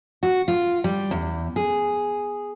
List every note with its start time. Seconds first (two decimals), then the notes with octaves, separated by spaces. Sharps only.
0.23 F#4
0.48 F4
0.84 G3
1.11 E2
1.56 G#4